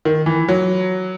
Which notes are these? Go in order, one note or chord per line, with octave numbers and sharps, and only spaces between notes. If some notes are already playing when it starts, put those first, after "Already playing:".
D#3
E3
F#3